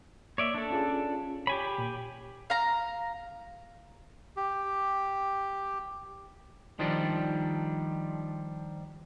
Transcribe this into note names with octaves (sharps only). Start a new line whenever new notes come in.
A#3 C#5 D5 E5
D4 A4
C#4 F4 G#4
G4 C#5 G#5 B5
A#2
F5 A#5
G4
D#3 F3 G3 D4